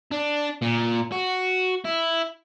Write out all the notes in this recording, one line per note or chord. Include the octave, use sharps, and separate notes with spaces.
D4
A#2
F#4
E4